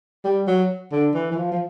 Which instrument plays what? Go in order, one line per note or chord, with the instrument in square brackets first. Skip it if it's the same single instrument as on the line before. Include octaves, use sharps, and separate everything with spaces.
[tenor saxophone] G3
F#3
D3
E3
E3
F3
F3